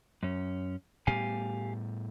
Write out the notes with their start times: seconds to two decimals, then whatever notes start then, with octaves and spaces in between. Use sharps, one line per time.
0.23 F#2 C#4
1.07 A2 G3 B3 G4 F5 G#5